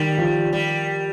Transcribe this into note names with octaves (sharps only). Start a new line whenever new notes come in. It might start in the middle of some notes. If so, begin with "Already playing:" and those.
Already playing: D#3 G3
F3
G3